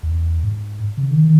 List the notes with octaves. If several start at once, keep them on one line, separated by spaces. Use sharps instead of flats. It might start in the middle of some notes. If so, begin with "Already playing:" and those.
E2
G#2
C#3
D#3
D#3